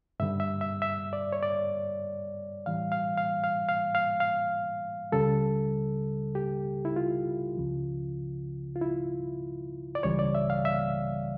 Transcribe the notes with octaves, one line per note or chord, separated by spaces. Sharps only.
G2 D3 G3 E5
E5
E5
E5
D5
C#5
D5
A2 E3 G3 F5
F5
F5
F5
F5
F5
F5
C#2 C#3 G3 A4
G4
E4
F4
C#2 C#3 F3
F4
E4
D5
C#2 C#3 E3 G3 C#5
D5
E5
F5
E5